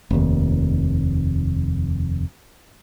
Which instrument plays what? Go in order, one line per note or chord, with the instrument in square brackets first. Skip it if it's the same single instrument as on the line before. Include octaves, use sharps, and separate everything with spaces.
[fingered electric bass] F1 D#2